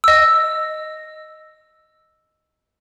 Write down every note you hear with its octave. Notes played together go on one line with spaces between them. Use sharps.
D#5 E6